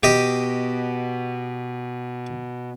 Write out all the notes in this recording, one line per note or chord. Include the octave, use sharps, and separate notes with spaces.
B2 G4 D#5